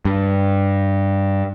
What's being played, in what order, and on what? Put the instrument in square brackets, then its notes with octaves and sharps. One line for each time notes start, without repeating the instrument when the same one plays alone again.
[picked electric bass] G2